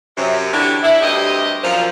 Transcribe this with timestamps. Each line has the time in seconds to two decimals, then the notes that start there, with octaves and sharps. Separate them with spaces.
0.17 F#2 C3
0.52 D3 E3 C#4 D4 F#4 G4
0.83 D4 E4
1.01 D2 G2 C3 G4 D#5
1.63 F#2 A#2 D3 F3